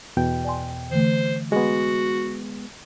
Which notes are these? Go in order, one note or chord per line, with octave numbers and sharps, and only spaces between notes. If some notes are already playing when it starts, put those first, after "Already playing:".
E2 B2 G5
D5 G#5 C6
D3 E3 A3 C5
G#3 B3 F#4